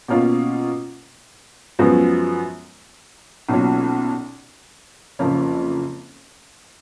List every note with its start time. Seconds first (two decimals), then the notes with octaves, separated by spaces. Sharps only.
0.08 B2 A#3 C#4 F4
1.79 F#2 F3 G#3 B3 F#4
3.49 B1 A#2 F#3 C#4
5.19 F#1 F2 F3 A#3 C#4